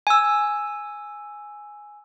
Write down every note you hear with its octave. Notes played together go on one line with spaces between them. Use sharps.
G#5 E6